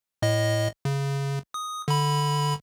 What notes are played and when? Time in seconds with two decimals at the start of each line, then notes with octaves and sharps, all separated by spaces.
0.22 A2 D#5
0.85 C#3
1.54 D#6
1.88 D3 B5